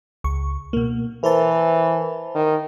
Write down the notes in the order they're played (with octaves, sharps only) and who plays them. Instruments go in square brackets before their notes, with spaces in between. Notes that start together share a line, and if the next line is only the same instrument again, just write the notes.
[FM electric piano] C#2 C#6
B2 A#3
[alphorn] E3 [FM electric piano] A#4 C5 A5
[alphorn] D#3